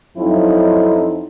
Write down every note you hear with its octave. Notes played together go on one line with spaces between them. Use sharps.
F2 F3 F#3 C4 D#4 E4